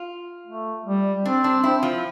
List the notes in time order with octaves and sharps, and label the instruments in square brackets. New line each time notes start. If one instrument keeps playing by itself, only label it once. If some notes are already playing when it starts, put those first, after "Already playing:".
Already playing: [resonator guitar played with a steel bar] F4
[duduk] A3
G3
[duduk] C4 [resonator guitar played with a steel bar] D4
[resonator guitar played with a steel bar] D4
E4
F3